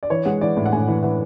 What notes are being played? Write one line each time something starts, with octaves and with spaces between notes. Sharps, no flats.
D5
E3 C#5
G#3 F#5
E3 D5
A2
F#5
A2 G#5
E3
E3 F#5